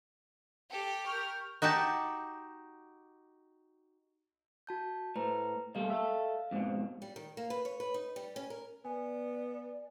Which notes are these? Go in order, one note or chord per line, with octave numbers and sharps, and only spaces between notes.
G4 A4
A#4 C#6 F6 G6
D#4 F#4 G4 G5 A5
F#4 A5 G6
A2 B4 C5 A#5
B2 G3 A3 D#5 F5
A4 E5
F2 G#2 B2
G3
D#3
A#3
B4
C#5
B4
D#4
G3
C#4
A#4
B3 D5 G#5